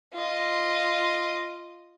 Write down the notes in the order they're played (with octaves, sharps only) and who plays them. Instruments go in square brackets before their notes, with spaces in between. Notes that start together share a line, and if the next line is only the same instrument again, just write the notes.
[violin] F4 D#5